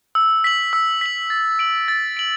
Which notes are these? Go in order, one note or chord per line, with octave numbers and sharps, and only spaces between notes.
E6
B6 F#7
E6
B6 F#7
A6
D7 F#7
A6
D7 F#7